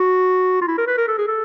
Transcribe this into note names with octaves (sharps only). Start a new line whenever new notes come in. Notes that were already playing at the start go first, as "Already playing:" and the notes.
Already playing: F#4
F4
E4
A#4
B4
A#4
A4
G#4
A4